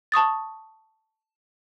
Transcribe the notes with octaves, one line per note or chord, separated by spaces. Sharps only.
A5 C#6 D#6 A6